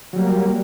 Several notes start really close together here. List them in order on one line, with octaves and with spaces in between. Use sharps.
F#3 G3 A#3